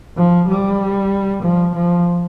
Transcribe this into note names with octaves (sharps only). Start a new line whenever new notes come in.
F3
G3
F3
F3